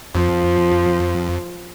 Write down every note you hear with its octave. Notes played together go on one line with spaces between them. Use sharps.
F2 F3